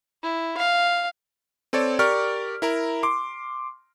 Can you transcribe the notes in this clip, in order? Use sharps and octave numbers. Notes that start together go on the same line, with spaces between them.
E4
F5
C4 A4 C#5 D5
G4 A#4 D5 C#6 F6
E4 A#4 A#5
C6 D6